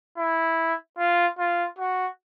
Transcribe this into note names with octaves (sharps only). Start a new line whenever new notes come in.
E4
F4
F4
F#4